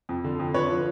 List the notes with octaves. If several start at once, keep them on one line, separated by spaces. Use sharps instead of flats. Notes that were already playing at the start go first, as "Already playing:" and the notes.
F2
D3
F2
D3 B4 C#5
F3